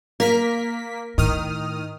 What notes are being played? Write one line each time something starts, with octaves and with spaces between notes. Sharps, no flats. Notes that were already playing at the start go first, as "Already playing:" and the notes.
A#3 A#4 B6
A2 D#3 D#6 F6